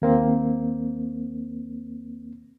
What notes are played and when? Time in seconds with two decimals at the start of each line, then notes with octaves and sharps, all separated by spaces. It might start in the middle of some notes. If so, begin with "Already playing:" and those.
0.02 D#2 A#3 C4